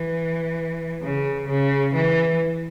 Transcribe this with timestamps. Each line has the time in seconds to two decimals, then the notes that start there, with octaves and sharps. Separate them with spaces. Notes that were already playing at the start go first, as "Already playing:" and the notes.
Already playing: E3
1.02 C#3
1.48 C#3
1.94 E3